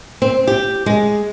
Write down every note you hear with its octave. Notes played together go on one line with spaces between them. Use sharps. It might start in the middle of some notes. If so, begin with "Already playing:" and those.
C4
G4
G#3